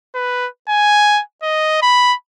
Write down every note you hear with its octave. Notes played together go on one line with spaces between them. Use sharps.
B4
G#5
D#5
B5